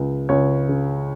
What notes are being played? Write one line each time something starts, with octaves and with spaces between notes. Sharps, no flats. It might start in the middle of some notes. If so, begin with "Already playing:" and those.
Already playing: C#2 G#3
C#2 C#5
C#3